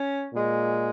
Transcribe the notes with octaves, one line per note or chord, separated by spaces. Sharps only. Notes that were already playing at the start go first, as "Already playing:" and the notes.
Already playing: C#4
A#2 G#3